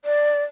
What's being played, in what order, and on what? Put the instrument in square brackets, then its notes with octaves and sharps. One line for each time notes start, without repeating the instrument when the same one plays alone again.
[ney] D5